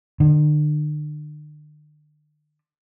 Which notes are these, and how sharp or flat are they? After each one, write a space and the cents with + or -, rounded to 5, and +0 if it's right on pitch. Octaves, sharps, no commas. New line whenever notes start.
D3 +40